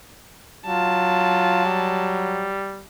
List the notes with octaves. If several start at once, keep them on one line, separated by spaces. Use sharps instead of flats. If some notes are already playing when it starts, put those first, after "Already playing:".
F#3 F4 A5
G3